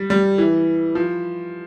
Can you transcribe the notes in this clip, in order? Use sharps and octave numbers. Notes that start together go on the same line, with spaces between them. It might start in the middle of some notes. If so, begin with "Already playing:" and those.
Already playing: G3
G3
E3
F3